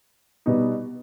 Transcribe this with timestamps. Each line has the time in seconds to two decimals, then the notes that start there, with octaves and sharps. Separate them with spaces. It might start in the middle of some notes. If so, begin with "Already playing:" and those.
0.46 B2 G3 B3 D#4